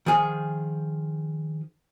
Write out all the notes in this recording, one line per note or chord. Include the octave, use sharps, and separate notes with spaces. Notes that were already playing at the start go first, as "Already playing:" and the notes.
D#3 F3 G#4 G#5